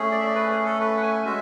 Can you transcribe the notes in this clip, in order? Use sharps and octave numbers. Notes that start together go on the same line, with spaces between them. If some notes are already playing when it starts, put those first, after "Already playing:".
Already playing: A3 C#4 G#4
D5
E5
D5
B4
G#4
A4
B4
F#5
G#5
G#3 C#4 F#4 E5